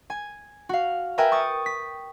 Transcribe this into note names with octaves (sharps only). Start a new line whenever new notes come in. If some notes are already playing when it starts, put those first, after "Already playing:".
G#5
F#4 F5
A#4 B4 E5 G5 G#5 A#5
C#6 D#6 A6
B6